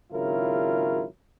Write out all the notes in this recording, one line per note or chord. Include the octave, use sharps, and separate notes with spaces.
G#1 C#3 F#3 E4 F4 A#4